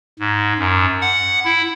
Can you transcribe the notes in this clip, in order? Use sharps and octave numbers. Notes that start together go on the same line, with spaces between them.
G#2
F#2
F#5
E4